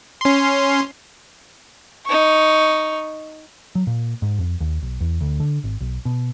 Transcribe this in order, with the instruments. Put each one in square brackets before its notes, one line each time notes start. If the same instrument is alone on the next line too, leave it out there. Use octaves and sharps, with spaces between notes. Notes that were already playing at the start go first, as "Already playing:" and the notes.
[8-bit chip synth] C#4 C6
[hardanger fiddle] D#4 C#6
[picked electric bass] F#3
A#2
G#2
F2
D#2
B1
E2
D2
D3
G#1
B1
B2